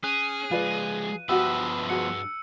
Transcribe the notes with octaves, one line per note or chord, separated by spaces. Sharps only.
C#4 G#4 F#6 D#7
F3 G#3 F4 B4 D5
G2 F3 B3 F#4 G4 B4 E5 E6
F#4 G#4 C#7